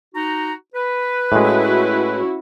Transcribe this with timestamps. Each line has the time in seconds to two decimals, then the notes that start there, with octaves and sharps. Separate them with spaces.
0.14 D#4 F#4 A#5
0.74 B4
1.32 A2 G#3 C#4 E4 F#4